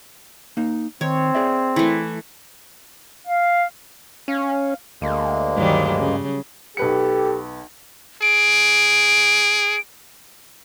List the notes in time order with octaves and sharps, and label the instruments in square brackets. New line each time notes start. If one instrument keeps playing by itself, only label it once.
[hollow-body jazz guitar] A#3 D#4
[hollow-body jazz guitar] D#3 [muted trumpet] C4 [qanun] C#5
[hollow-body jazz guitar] G#4 D5 E5
[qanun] E3 A3
[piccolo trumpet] F5
[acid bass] C#4 [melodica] F5
[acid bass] D2 [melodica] G#3 A#3
[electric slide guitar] G2 [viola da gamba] D#3 F#3 G3
[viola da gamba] C#3
[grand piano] B1 B4 C#7 [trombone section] G4 A4
[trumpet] G#4 [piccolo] D7